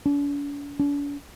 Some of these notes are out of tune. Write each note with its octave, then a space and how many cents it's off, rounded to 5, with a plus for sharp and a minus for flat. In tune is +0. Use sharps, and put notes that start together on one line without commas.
D4 -45
D4 -45